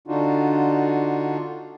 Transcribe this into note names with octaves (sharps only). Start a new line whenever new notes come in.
D3 D4 D#4 F4 F#4